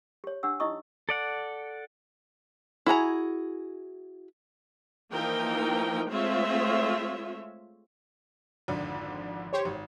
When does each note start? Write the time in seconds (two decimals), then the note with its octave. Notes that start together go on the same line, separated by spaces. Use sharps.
0.24 G4 C#5
0.43 D4 G4 F#5 E6
0.60 D#4 E4 G4 D#5 C#6 D#6
1.09 A4 D5 F#5
2.87 E4 F#4 G#4 A#5
5.12 E3 F3 A#3 D#4 A#4 G5
6.10 G#3 A3 C4 F4 C#5 E5
8.68 G#1 F2 D3
9.53 G4 C5 C#5
9.65 G#1